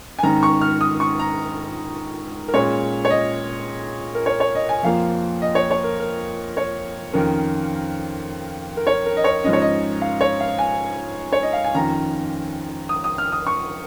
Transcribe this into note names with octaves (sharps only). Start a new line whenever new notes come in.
G#5
G#2 D#3 C#4 A#5
C#6
F6
D#6
C#6
A#5
A#4
A#2 G#3 C#4 C#5
C#5
D#5
A#4
C#5
C#5
D#5
G#5
F2 F3 A#3 F5
D#5
C#5
C#5
A#4
A#4
C#5
F2 D#3 C#4 A#4
A#4
C#5
A#4
D#5
C#5
G#2 F3 C#4 D#5
C#5
D#5
F5
C#5
F5
G#5
C#5
D#5
F5
G#5
F2 D#3 C#4 A#5
D#6
D#6
F6
D#6
C#6